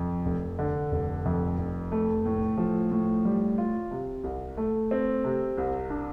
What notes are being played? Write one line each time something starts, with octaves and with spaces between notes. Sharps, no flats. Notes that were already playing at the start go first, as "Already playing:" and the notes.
Already playing: F2
F1
D3
F1
F2
F1
A3
A2
F3
A2
G3
F4
C3
C2
A3
C4
C3
C2
D4